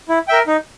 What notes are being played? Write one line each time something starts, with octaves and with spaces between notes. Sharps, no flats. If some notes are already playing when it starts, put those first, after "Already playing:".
E4
A#4 E5 G5
D#4